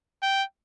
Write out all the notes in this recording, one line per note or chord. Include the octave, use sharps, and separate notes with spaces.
G5